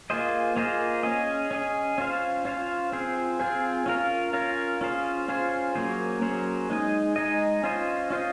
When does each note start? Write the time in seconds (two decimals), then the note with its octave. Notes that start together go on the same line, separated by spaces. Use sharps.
0.10 A#3 F4 G#4 C5 D#5
0.56 A#3 F4 G#4 C5 D#5
1.03 C#4 G#4 D#5
1.51 C#4 G#4 D#5
1.98 C#4 F4 C5 F5
2.45 C#4 F4 C5 F5
2.92 C4 F4 G#4 C5
3.40 C4 F4 G#4 C5
3.86 C#4 F4 A#4 F5
4.33 C#4 F4 A#4 F5
4.81 C#4 F4 G#4 C5
5.28 C#4 F4 G#4 C5
5.75 F#3 A#3 C#4 G#4 C5
6.22 F#3 A#3 C#4 G#4 C5
6.70 G#3 D#4 G#4 D#5
7.16 G#3 D#4 G#4 D#5
7.64 C#4 F4 C5 D#5
8.10 C#4 F4 C5 D#5